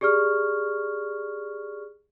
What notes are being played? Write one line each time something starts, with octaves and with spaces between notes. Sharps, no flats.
G4 G#4 D5 C#6 F6